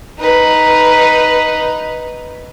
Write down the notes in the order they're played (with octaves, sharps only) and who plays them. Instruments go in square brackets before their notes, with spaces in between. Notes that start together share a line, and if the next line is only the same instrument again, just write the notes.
[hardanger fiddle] D#4 B4